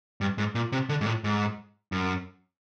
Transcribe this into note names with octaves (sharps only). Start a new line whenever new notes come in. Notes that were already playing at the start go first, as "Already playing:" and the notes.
G2
G#2
A#2
C3
D3
G#2
A2
G#2
F#2